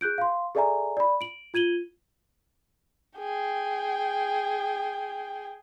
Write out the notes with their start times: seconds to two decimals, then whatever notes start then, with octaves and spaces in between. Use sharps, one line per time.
0.01 G#4 F#6 G6 D7
0.18 F5 C6
0.55 G#4 A4 D5 E5 G#5 A#5
0.97 D5 B5
1.21 D7 F#7
1.54 F4 G#6 D#7 F#7 G7
3.18 G#4 G5